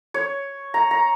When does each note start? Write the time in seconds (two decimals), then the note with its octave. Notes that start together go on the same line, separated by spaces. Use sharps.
0.14 C#5
0.74 A#5
0.91 A#5